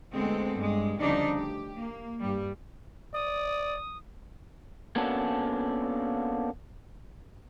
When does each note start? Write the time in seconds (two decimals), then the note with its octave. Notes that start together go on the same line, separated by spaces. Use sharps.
0.14 D2 G#3 B3 C4 A4
0.55 G2 G#3
0.99 D2 C#3 F3 G3 D4 D#4
1.37 G4
1.76 A#3
2.20 G2 G3
3.14 D5 D#6
4.96 A#3 B3 C#4 D4 F#4 A4